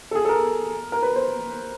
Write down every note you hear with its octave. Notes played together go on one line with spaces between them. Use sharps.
A4
G#4
A4
A#4
A#4
B4
C5